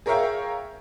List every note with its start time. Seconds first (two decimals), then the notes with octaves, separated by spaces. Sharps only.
0.06 G#4 A#4 C#5 E5 F5 G5